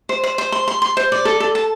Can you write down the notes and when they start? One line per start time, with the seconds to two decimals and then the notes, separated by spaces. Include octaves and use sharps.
0.09 C5
0.24 C5
0.38 C5
0.52 C6
0.68 C6
0.82 C6
0.97 C5
1.12 D5
1.25 A4
1.40 A4
1.55 A5